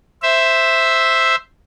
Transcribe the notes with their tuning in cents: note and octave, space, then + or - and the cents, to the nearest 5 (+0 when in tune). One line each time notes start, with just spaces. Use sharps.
C5 +0 E5 +0